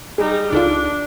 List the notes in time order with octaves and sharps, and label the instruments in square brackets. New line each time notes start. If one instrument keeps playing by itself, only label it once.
[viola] G3 D#4 [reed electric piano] G#4
[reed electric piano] C#2 D#4 [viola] D4 [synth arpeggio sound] F4 A4 D5